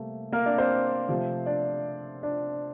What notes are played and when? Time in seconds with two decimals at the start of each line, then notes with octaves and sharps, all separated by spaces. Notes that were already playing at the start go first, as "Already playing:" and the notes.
Already playing: C3 G3 A3 A#3
0.32 A#3 A#4
0.46 D4 D5
0.58 C4 C5
1.09 C3 F3 A3
1.46 D4 D5
2.23 D4 D5